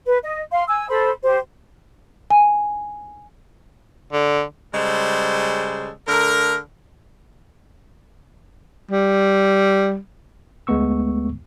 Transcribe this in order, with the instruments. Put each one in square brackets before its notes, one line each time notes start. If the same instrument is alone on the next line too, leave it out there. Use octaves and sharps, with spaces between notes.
[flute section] B4
D#5
F5 C6
G#5 E6
A4 C5 B5
G4 C5
[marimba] G#5
[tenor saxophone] D3
[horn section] C#3 G3 G#3 A4 C5
D3 A3 A#4
[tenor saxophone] G3
[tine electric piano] D2 G#3 A3 B3 C#6 E6